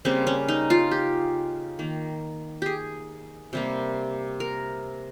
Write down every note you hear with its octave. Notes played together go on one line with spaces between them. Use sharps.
C#3 G3 A#3 C4
C#4
D#4
F4
G4
D#3 A#3
G4 G#4
C3 G3 A#3
A#4